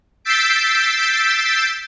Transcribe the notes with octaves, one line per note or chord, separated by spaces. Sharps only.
E6 G6 A6 B6 C7 D7